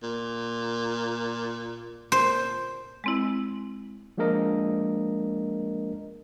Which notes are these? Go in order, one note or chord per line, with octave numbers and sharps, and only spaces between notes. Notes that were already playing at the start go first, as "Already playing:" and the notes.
A#2
A#2 C5
G#3 C4 E4
F3 G#3 A#3 D4 A#4 D#5